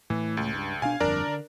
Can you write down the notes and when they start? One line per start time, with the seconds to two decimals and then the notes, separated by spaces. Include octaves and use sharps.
0.10 A2 E3
0.37 C#2
0.54 G2
0.82 B2 D4 F5 G#5
1.00 G1 F2 D4 A#4 D5
1.27 D3